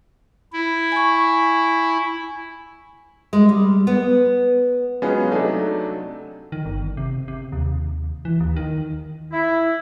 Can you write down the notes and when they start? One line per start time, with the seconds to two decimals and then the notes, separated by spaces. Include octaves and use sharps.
0.53 E4
0.92 G#5 C#6
3.33 G#3
3.49 G3
3.87 B3
5.02 F#3 G#3 B3 C#4 F4 G#4
5.32 C3 F#3 A3 D4 D#4
6.52 D#3
6.65 G1
6.97 C3
7.28 C3
7.52 D#2
8.25 E3
8.40 D#2
8.56 D#3
9.32 E4